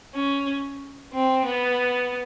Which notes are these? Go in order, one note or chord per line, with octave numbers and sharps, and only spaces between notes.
C#4
C4
B3